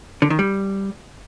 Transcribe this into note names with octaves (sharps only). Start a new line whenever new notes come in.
D3
D#3
G3